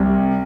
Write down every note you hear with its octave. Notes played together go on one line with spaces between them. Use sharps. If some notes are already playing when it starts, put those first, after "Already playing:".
Already playing: C2